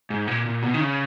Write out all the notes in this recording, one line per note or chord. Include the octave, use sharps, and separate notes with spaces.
G#2
A#2
A#2
B2
D#3
C#3